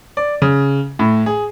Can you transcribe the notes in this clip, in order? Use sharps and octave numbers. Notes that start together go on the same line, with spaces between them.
D5
C#3
A2
G#4